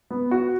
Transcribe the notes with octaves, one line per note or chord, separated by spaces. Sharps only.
B3
F#4